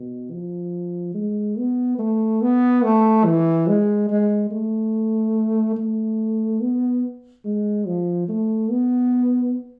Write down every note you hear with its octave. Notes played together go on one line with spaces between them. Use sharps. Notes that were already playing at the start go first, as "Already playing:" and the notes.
Already playing: B2
F3
G#3
B3
A3
B3
A3
E3
G#3
G#3
A3
A3
B3
G#3
F3
A3
B3